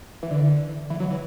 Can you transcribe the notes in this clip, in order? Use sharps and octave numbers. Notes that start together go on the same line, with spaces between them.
E3
D3
E3
F#3
E3